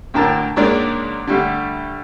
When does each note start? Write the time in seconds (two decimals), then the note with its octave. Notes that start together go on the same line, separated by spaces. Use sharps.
0.14 D2 A2 D3 A#4 G5 A5
0.56 C#2 G#2 A#3 D4 D5
1.27 D3 G3 A3